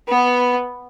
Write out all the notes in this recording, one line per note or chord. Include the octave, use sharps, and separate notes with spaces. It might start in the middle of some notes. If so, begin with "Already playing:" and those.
B3